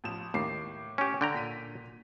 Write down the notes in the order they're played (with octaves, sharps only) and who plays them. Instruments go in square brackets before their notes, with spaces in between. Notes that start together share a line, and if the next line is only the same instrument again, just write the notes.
[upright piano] A1 F3 E7
[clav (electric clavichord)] D#2 [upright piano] A2 D6 C7
[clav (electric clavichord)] C#4 G4
D3 G5 A#5
[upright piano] A#2 B6 D#7